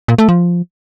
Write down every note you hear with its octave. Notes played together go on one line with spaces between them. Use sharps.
A#2
A3
F3